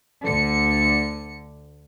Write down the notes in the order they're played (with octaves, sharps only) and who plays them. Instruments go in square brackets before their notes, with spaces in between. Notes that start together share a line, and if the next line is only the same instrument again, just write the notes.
[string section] D2 D3 C#7